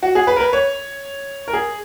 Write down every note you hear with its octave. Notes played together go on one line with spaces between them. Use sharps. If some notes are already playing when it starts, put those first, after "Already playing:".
F#4
G#4
B4
A#4
B4
C#5
A#4
G#4